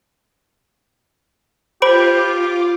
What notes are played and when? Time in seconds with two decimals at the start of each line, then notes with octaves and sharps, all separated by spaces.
1.82 F4 G4 C5 B5 D6 D7